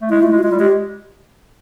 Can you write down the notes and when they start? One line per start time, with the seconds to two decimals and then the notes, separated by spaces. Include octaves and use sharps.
0.02 A3
0.10 G#3 E4
0.21 A3 F4
0.27 E4
0.32 G#3
0.39 F#4
0.43 G#3 F4
0.51 G3
0.59 G#3 G4